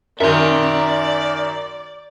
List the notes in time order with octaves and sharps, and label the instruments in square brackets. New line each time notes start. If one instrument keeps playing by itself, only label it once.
[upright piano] F#2 D#3 [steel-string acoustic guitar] A#4 [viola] D5 [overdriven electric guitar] E5 C6